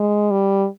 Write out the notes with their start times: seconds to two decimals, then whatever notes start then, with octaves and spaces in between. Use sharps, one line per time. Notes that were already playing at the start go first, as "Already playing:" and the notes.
Already playing: G#3
0.31 G3